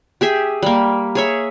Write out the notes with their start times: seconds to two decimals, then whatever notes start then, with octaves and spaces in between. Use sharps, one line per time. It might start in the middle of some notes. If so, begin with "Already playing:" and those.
0.21 G4 G#4 E5
0.62 G3 A#3
1.15 G#4 C#5 E5